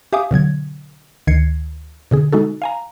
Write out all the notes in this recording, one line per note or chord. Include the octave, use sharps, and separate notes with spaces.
G4 E5 F5 G#5 D6 D#6
B2 D3 F#3 G#6
D2 D#3 G#6 C7 C#7
B2 D3 G#4
G#3 D#4 F#4 A4
F5 G#5 A#5